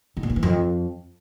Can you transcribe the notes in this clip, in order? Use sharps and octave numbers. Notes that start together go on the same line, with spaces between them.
D#3
A#2
C#3
E3
F2